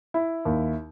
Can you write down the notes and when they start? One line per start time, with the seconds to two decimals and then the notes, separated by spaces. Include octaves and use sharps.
0.14 E4
0.45 D#2